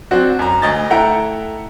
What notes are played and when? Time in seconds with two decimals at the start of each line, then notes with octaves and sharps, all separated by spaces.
0.11 F#3 C4 D4 F#4
0.39 F#2 A#5
0.62 D2 D#5 A6
0.90 A3 E4 F#5 G5 A#5 D7